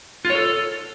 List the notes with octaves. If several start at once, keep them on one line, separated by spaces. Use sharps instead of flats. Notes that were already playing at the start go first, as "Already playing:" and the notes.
F4
C#5
A4